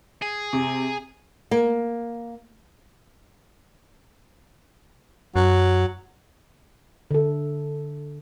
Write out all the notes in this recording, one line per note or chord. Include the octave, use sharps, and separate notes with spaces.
G#4
C3
A#3
F#2 F#3
D3 A4